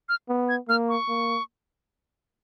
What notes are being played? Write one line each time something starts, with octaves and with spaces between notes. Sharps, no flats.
F6
B3
G#6
A#3 F6
C#6
A#3